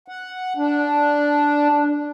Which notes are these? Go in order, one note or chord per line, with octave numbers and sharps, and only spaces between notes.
F#5
D4